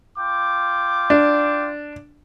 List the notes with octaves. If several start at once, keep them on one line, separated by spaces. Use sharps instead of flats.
F4 G5 D6
D4